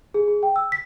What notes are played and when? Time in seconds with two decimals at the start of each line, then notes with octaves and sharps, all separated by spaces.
0.14 G#4
0.28 G#4
0.43 G5
0.56 E6
0.72 B6